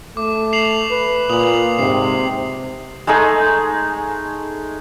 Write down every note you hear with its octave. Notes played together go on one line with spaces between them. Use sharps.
A3 D6
C7 F7 F#7
B4
A#2 D#6 F7 F#7
G#2 C3 C7
G#3 A3 D#4 G#4